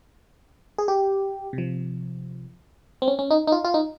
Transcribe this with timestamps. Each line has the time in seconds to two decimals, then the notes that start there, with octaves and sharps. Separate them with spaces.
0.78 G#4
0.88 G4
1.53 C3
1.58 F3
3.02 C4
3.08 C#4
3.19 C#4
3.31 D#4
3.47 D#4
3.52 F4
3.65 F4
3.74 D#4